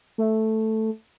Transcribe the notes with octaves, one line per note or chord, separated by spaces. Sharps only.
A3